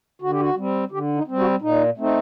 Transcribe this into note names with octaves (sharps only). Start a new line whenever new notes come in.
D3 F#4
G4
F#4
G3 C4
D3 G4
D#4
G3 C4
F#4
A#2 D#4
A3 C4 D#4